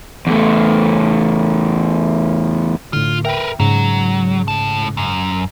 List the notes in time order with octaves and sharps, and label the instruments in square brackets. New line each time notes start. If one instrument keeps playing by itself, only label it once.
[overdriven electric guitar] E2 A3
[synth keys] A2 D3 [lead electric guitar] F4
[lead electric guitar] A#4 B4 [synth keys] E5 G5
[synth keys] G#2 C#3 [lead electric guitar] F#3
[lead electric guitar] A2 A5
F#2